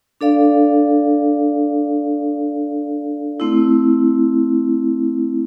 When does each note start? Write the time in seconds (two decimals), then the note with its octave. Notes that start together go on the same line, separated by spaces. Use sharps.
0.21 D4 A4 D5 F5
3.40 A3 C4 E4